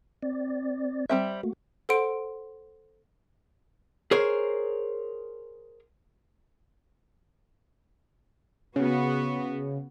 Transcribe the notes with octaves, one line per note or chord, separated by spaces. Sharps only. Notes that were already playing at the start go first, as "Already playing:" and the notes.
C4 D5
G3 C4 E5
A3 A#3 F#4
A4 C5 F#5 C6 D7
G#4 A#4 C5 C#5
C#3 B3 F#4